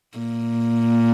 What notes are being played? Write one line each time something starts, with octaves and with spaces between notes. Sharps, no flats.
A#2